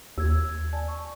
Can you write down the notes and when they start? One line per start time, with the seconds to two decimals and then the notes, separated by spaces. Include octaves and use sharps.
0.18 D#2 E6 G#6
0.73 D5 G#5 A5
0.88 C#6